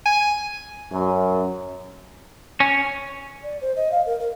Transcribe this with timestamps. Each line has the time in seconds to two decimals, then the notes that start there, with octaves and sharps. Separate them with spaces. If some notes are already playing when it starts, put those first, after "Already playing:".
0.06 G#5
0.92 F#2
2.60 C#4
3.43 D5
3.61 C5
3.76 D#5
3.91 F5
4.06 A#4
4.20 A#4